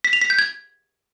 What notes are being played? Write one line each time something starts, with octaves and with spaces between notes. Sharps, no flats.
B6
F7
B6
G6
G#6